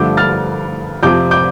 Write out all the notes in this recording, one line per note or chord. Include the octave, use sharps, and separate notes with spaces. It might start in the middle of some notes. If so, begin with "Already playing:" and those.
Already playing: G2 D3 F3 A3 D6 G6
F6 A6
F2 C3 F3 C4 D6 G6
D6 G6